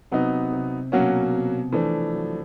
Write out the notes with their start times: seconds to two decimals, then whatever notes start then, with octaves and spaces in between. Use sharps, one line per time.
0.12 C3 F#3 B3 D#4
0.52 C3
0.92 B2 F#3 A#3 C#4 F#4
1.33 C3
1.72 E3 F3 A3 D4
2.13 F#3